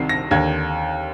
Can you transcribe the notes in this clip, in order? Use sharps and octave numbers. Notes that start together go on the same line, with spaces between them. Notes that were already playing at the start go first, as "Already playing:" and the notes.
Already playing: C2 C3 D#3 C7
A#6
D#2 D3 G#6